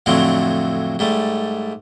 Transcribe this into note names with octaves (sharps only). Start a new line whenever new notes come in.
F2 A2 D3 F3 F#3 C4
G#2 G3 A3